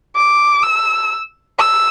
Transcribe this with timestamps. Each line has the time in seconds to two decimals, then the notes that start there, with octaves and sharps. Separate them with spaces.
0.16 D6
0.63 E6
1.59 E6